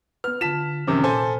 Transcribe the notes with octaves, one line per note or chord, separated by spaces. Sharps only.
B3 B4 F6
D3 F4 A5 B6 E7
F#2 C3 D#3 F3 C#4 D6
A#2 A4 C5 G#5